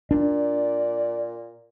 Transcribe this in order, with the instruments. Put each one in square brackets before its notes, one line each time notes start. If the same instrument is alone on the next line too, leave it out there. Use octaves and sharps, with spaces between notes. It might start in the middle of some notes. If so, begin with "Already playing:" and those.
[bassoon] A#2 [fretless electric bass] D4 [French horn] D5